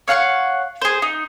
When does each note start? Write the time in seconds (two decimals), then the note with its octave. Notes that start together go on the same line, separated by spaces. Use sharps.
0.08 C#5 F5 F#5 C#6
0.82 G#4 C5
1.02 D#4